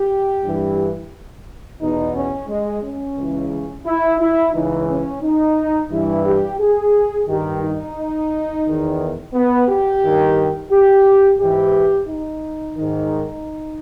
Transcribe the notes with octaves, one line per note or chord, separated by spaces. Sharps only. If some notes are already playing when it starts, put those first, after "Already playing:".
Already playing: G4
G2 E3
E2 B2 D#4
C#4
G#3
C#4
C#2 C#3 E3
E4
E4
C#2 C#3 E3 D#4
C#4
D#4
G2 E3 E4
G4
G#4
G2 D#3 G4
D#4
E2 D#3
B3
G4
G2 D#3
G4
G#2 E3 G4
D#4
G#2 D#3